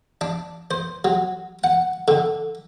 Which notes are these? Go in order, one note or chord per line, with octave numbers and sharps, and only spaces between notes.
D4
C5
F#3
F#5
D3